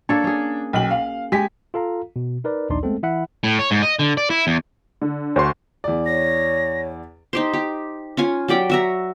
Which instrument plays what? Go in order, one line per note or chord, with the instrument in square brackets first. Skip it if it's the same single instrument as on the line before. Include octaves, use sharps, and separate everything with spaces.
[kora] A#3 A4 C#5 [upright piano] D4
[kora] C#4 G#4
[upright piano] B1 G5 F#7
F5
[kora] G#3 [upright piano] G4 G#5 B6
[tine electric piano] F4 A4 F5 A#5
B2
D#4 A#4 B4 D5
A#1 D#2 D4 D#4 D5 C6
G#3 A3 B3 C4 A4
E3 E4 E5 F#5 B5
[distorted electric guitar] A2
C#5
G#2
D#5
D3
D5
E4
E2
[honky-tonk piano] D3
[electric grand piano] D2 F#4 C6 [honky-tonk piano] C5 C#6
[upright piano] E2 D5
[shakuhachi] C#5 [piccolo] A#6
[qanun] D#4 G4 C5
G4
C#4 F4 G#5
F#3 G4 D5 G5
F#4 E5 A#5